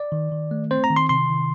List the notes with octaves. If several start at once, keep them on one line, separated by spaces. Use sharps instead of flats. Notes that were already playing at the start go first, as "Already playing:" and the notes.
Already playing: D5
D#3
D#3
A3
C4 C5
A#5
D#3
C6
C3 C6
D#3